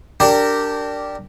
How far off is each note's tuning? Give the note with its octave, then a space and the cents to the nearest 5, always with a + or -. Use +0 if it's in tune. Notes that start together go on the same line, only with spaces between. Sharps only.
D4 +0 G4 -10 A#4 -25